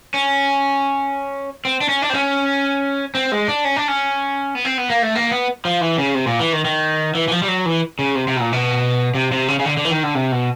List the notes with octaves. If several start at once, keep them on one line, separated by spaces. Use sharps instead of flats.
C#4
C4
D4
C#4
D4
C4
C#4
C4
G#3
D4
C#4
D4
C#4
B3
C4
B3
A#3
A3
A#3
B3
F3
E3
C#3
C3
A#2
E3
D#3
D#3
E3
E3
F3
G3
F#3
E3
C#3
C3
C3
B2
A#2
B2
C3
C3
C#3
C#3
D3
D3
E3
D#3
D3
C3
B2